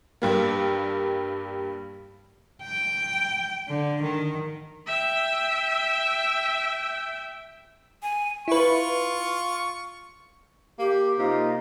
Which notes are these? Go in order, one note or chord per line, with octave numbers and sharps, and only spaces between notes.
G2 G3 A#3
G5
D3
D#3
E5 G5
G#5
E4 F4 B4 C#6
A#3 G4
C3 A#3 D#4 F4